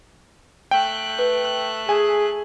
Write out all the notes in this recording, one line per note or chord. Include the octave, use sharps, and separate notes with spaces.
A3 G5 F#6
B4
G#4 G#5